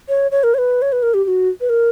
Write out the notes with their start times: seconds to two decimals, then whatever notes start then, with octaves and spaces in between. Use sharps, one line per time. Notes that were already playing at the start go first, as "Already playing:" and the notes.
0.09 C#5
0.31 C#5
0.44 A#4
0.54 C#5
0.58 B4
0.82 C#5
0.92 B4
1.03 A#4
1.14 G4
1.25 G4
1.28 F#4
1.61 B4
1.69 A#4